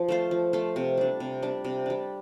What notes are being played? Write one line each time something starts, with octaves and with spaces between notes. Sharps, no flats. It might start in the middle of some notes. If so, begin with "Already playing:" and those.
Already playing: F3
A3 F4 C5
F3
A3 F4 C5
C3
G3 D4
C3
G3 D4
C3
G3 D4